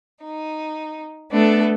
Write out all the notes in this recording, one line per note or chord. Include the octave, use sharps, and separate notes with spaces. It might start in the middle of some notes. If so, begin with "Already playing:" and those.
D#4
A3 B3 D4 A4